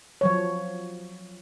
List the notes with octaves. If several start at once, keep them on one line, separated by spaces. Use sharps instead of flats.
F3 F#3 C#5